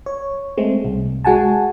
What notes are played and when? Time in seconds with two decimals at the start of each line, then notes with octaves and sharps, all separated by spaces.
0.06 C#5
0.58 G#3 A3 C4
0.85 C2
1.25 G#3 F#4 F#5 G#5 A5